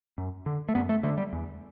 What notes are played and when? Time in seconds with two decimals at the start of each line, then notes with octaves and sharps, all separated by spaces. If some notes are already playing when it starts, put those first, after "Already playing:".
0.18 F#2
0.46 D3
0.69 A3
0.75 F#2 B3
0.89 A3
1.03 D3 A3
1.18 G3
1.33 E2